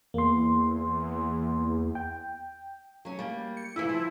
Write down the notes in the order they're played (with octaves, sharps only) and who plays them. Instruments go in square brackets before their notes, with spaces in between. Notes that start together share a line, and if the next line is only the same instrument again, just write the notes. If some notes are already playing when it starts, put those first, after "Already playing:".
[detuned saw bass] E2 [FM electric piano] A#3 C6
[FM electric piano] G5
[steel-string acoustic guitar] F#3 C#4
G3 A#3
[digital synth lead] C#7
[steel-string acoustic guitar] G2 C#3 E3 [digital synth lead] E4
[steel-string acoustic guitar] F3